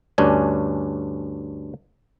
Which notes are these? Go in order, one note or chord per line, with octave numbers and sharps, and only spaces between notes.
D2 G2 C#4 D4 G#5